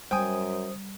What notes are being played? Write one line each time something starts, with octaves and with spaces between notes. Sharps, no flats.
F#2 G3 C5 G5 G#5 D#6